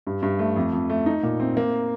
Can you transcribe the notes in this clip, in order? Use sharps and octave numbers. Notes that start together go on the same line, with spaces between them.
G2
G2
A3
F2
F2
A3
D#4
A#2
C4
A#3